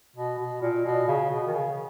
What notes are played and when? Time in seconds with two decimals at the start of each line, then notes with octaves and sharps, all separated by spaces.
0.16 B2
0.39 B2
0.62 A#2
0.85 B2
1.08 C#3
1.31 B2
1.47 D#3
1.53 C#3